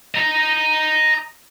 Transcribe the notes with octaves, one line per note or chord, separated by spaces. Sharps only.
D#5 A#5